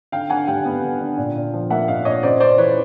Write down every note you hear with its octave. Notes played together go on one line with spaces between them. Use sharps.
D3 F5 G5
D3 F#5 G#5
G3 F5 G5
B3
D3
D3
A#2
A#2
F3
A#3 E5 F#5
A#2 D#5 F5
A#2 C#5 D#5
C#3 C5 D5
C#4 C5 D5
E3 B4 C#5